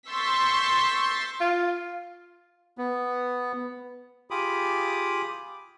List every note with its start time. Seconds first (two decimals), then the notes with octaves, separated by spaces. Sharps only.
0.10 C6 C#6 E6 G6 A6 B6
1.41 F4
2.78 B3
4.31 F4 G4 G#4 B5 D6 D#6